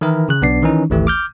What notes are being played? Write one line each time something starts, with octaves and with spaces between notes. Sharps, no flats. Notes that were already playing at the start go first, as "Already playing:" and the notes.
D#3 E3 E4 A#4
C#3 F#6
B1 B3 D4 D5 C7
D#3 E3 C#4 D#4
G#1 D2 E3 A3 G4
D6 F6 G6